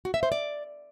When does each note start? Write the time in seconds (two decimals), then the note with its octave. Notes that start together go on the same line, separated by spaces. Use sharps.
0.05 F#4
0.14 E5
0.23 C5
0.32 D5